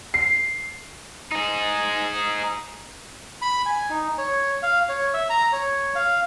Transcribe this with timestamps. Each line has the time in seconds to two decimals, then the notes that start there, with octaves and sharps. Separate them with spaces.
0.14 C7
1.31 D#4 G#4
3.42 B5
3.66 G#5
3.90 D#4
4.18 C#5
4.63 F5
4.89 C#5
5.14 E5
5.30 A#5
5.53 C#5
5.95 F5